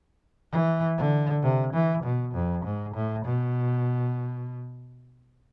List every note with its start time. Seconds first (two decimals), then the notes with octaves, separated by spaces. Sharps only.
0.52 E3
0.98 D3
1.43 C3
1.73 E3
2.03 B2
2.34 F2
2.65 G#2
2.94 A2
3.25 B2